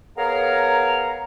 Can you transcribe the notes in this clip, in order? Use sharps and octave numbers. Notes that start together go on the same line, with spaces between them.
B3 G#4 A#4 C#5 F5 A#5